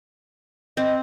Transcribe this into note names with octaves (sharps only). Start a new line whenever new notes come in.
C4 D#5